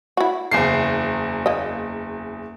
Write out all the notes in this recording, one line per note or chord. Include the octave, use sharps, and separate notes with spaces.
E4 F#4
F#1 E2 C7
A#3 D#5